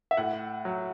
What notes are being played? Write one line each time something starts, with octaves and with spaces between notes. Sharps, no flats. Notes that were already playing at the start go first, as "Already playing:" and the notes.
E5
A2 F#5
F#3